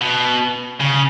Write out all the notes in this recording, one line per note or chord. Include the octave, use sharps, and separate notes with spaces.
B2
C#3